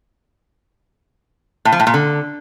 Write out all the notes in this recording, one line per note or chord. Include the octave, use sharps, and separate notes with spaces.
A2
F3
A2
A#2
D3